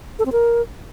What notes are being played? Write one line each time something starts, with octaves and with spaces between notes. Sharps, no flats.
A4
C4
A#4